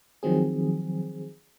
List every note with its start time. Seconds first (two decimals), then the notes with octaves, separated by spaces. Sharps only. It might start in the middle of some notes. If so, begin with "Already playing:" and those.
0.23 D#3 F3 F#3 C4 G#4